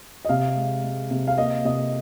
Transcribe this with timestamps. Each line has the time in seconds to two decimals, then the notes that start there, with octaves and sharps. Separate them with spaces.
0.25 D#5
0.29 C3 F5
0.56 G#3
0.84 G#3
1.11 C3
1.27 F5
1.38 A#3 D#5
1.65 C3 D#5